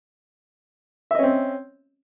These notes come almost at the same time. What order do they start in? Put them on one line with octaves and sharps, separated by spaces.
E5 D#5 C#4 C4